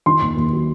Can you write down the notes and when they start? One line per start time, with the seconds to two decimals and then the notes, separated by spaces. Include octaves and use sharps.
0.06 D#3 C6
0.22 D#2
0.37 D#2
0.53 F#3